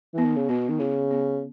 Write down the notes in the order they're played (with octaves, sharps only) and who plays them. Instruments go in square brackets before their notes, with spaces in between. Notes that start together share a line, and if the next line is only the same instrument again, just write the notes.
[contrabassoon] E3 [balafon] B3
[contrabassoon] D#3
C#3
[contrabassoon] B2 [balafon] B3
[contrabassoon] D#3
[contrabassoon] C#3 [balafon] E4
[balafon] B3